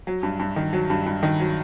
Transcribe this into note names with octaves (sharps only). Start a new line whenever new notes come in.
F#3
G2
G2
D#3
F#3
G2
G2
D#3
F#3